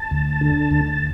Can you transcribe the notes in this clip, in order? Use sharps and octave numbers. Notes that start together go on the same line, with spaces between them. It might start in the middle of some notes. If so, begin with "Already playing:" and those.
Already playing: A5
D2
D3
D2